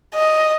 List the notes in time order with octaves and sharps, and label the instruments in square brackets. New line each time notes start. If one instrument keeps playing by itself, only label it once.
[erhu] D#5